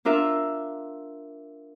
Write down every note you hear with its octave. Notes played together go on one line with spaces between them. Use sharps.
D4 F4 A#4 E5